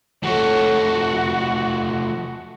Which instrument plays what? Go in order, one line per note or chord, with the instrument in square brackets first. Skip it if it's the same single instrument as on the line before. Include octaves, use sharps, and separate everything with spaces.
[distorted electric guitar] F3 A3 [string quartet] F#4 [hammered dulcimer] A4 C#5